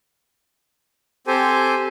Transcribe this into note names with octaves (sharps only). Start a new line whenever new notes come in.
C4 G4 A4 C5 G#5